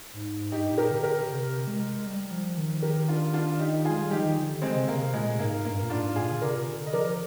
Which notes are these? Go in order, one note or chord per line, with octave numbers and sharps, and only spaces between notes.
G#2
G2 D#4 G4
A#2
G4 A#4
D3
G4 A#4
C3
G#3
G3
F3
F3
D#3
G4 A#4
D4 F4
D4 F4
D#4 G4
G#3 F4 G#4
G3
F3 D#4 G4
D#3
D3
G#3 C4
C3
D3 A#3
C3
A#2 G#3
G#2 A#3
G2 A#3
A#2
G#2 D4 F4
A#2 F4 G#4
D3
C3 A#4 D5
D3
D#5
F3 A#4 D5